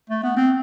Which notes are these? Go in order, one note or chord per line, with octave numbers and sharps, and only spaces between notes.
A3
B3
C4